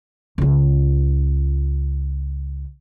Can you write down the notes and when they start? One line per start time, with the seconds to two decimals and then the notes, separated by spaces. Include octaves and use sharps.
0.38 C#2 F4